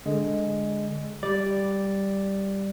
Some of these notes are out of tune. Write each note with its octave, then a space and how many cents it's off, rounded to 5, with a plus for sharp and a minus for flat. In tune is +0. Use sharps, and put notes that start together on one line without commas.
D3 -5 G#3 +0
G3 +0 D5 +0